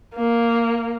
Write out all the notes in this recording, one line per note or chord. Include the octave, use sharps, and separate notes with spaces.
A#3